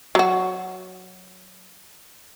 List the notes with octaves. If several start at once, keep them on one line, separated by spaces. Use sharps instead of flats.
F#3 F#4